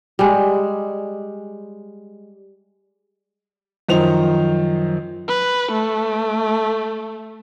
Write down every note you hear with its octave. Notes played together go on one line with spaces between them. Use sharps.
G3 G#3
F#2 D#3 F3 D#4 C5 F7
B4
A3